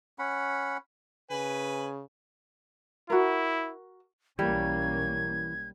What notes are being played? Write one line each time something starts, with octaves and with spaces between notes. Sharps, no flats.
C#4 F#5 B5
C#3 B4 G#5
E4 F#4 A#4
B1 E3 G3 A#3 C#4 G#6